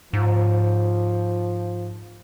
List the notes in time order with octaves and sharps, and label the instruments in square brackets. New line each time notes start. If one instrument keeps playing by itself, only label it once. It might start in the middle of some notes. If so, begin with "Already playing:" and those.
[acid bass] G#2 [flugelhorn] F3